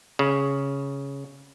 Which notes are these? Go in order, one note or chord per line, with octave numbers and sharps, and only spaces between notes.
C#3